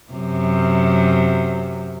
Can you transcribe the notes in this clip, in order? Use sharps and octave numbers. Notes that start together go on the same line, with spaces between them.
F#2 C3